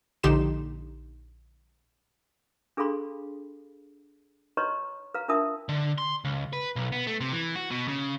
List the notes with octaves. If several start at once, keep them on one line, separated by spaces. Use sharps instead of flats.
A#1 D3 D#4 G4 C6 E7
D4 G#4 A4 F5 B5 C6
B4 C#5 D#5 A#5 C6 C#6
B4 F5 A#5
D4 F4 A#4 E5 A5 D#6
D3
C6
C#2
B4
B1
B3
A3
C3
E3
F#4
B2
C#3